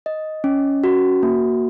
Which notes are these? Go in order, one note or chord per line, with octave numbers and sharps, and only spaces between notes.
D#5
C#4
F#4
A#3